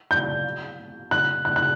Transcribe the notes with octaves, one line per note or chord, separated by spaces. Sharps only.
G6
F#6
F#6
F#6